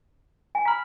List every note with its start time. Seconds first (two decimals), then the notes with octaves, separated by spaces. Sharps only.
0.55 G#5
0.65 A#5 B5 F6 B6